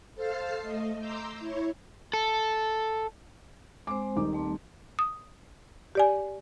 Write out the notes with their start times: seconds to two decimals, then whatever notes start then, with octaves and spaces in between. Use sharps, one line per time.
0.15 A4 C5 F5 A5 F6 C7
0.60 A3 D#5
0.99 A#5 C6 D6 E6 G6
1.40 E4 C#5
2.13 A4
3.87 G#3 C4 C5 D6
4.16 D#1 D#3 D6
4.33 G3 A3 C4
4.99 D#6
5.95 G4 D5 G#5